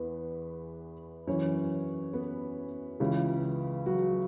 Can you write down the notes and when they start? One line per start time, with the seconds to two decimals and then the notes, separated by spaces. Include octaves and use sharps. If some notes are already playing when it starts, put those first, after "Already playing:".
Already playing: E2 E3 B3 B4
1.27 F#2 E3 C#4 C#5
2.13 B3 B4
3.00 C#2 C#3 E3
3.86 F#3 F#4